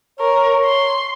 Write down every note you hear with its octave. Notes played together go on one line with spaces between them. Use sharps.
A#4 C#5
C6